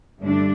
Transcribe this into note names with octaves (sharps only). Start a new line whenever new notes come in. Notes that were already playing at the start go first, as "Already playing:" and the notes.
G2 D3 A3 D4